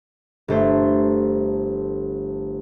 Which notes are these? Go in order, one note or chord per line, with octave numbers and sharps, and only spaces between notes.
G1 A3 C5